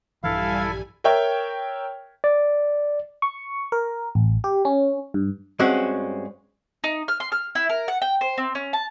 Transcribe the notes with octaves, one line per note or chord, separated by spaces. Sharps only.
A#1 G2 E3 G3 E4 A4 F5 G#5
A#4 C#5 E5 G5
D5
C#6
A#4
A1
G4
C#4
G2
G2 G#3 C4 C#4 F#4
D#4
F6
C6
F6
E4
A#4
F#5
G5
C5
C4
C#4
A5